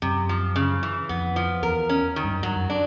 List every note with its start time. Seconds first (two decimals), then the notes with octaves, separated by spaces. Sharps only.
0.02 F#2 C3
0.29 F3
0.56 C#3
0.83 E3
1.09 F2 B3
1.36 F3
1.62 E2 A#4
1.89 C#4
2.16 D#3
2.24 G2
2.30 F#2
2.43 G2 F#3
2.56 F#2
2.70 D4